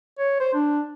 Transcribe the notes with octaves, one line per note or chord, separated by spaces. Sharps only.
C#5
C5
D4